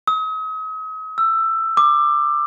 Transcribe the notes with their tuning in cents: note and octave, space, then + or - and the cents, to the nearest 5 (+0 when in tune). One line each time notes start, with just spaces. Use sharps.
D#6 +40
E6 +15
D6 +20